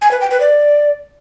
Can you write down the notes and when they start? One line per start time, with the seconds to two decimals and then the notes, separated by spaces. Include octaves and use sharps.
0.02 G#5
0.11 B4
0.21 G5
0.31 B4
0.40 D5